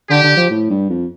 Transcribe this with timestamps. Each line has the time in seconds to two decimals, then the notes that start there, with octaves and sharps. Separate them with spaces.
0.10 D3 G4
0.23 D3
0.37 F3
0.50 A2
0.70 G2
0.90 F2